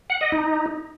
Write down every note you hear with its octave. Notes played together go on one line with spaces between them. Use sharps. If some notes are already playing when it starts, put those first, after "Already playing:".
F#5
D#5
D#4